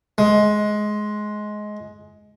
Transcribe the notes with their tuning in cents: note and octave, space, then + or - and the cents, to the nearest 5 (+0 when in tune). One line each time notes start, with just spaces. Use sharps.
G#3 +15